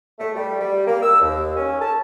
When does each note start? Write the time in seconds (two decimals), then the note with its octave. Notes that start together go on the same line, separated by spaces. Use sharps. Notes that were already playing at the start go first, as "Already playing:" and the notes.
0.19 A3
0.35 G3
0.61 G3
0.87 A#3
1.03 E6
1.21 D#2
1.56 C#4
1.82 A5